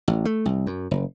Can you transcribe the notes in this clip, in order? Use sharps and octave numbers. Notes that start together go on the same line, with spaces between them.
A1
A3
C2
F#2
F#1